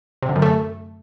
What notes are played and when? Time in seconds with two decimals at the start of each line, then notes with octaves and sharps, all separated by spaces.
0.23 C3
0.29 D3
0.36 F#2
0.42 A3